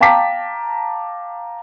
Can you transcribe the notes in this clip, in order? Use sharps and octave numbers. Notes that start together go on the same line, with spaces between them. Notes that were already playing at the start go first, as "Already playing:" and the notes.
F5 G5 A5 A#5 D6 B6